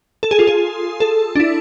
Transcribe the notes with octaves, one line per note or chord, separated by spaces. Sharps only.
A4
G#4
F4
G#4
A4
D4
E4